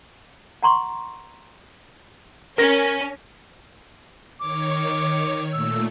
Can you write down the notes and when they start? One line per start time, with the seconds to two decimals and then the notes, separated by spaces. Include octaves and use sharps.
0.63 F#5 A#5 C6 C#6
2.58 C#4 A#4 A#6
4.40 D#3 C#5 D6
5.52 A#2 A3 E6